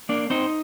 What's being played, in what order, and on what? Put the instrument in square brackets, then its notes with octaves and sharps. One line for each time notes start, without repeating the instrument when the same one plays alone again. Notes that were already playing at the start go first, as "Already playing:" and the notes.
[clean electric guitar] A#3 D4 D5
C4 D#4 C5